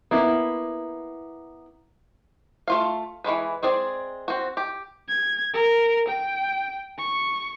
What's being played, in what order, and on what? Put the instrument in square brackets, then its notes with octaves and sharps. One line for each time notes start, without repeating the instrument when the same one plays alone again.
[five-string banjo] A#3 B3 E4
A3 F4 F5
E3 F3 G#3 B4
G#3 C4 G#4 D5
C4 F#4
G4
[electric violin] G#6
A#4
G5
C#6